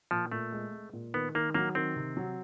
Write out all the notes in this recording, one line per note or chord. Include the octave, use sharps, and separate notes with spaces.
A#2 F3
A#2 A3
G#3
G#3
A#2
D#3 B3
D#3 A#3
F#3 A#3
D#3 C4
C3
F#3